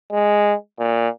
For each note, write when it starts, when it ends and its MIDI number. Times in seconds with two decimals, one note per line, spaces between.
0.12 0.55 56
0.79 1.09 46